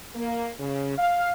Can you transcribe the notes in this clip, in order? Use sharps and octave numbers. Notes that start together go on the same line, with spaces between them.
A#3
C#3
F5